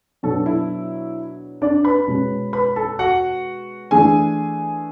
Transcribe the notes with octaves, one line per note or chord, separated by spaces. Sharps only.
B2 F#3 B3 D4 A4 A5
E4 E5
D4 D5
B4 B5
B2 G#3 C#4
B4 B5
A4 A5
F#4 F#5
E3 A3 D4 G#4 G#5